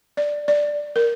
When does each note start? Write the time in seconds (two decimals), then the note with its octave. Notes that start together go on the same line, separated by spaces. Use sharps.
0.17 D5
0.48 D5
0.96 A#4